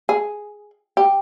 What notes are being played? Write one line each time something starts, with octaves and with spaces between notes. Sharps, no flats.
G#4
G4